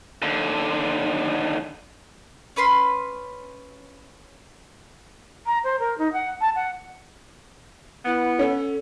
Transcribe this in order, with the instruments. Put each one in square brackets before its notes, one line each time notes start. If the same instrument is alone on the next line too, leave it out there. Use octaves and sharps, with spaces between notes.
[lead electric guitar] D#2 D3
[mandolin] C#4 B4 B5 C6
[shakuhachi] A#5
C5
A#4
D#4
F#5
A5
F#5
[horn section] B3 [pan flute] E4
[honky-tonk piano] C#4 [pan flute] A4